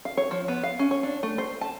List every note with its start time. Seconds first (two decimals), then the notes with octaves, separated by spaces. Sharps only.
0.05 F5
0.17 C#5
0.31 F3
0.48 B3
0.63 F5
0.79 C#4
0.91 C#5
1.03 D4
1.23 A3
1.38 C5
1.61 A5